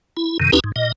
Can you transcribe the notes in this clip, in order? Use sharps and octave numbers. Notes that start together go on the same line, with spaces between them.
E4
F#2 C3 D#3
D#2 C#4 D#4 E4 G4 B4
G#2
A#2 D#5